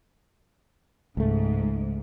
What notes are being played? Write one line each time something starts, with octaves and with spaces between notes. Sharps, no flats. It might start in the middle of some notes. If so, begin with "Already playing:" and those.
C#2 G#2 A3